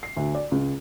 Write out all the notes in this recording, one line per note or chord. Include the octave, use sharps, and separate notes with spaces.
C7
D2
D5
C#2